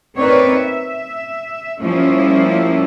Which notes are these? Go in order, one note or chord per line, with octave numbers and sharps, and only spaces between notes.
C4 D#4 A#4 B4 C#5 D5
E5
F3 G3 A#3 C#4 E4 F4